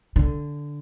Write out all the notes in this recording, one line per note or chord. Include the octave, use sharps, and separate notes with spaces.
D3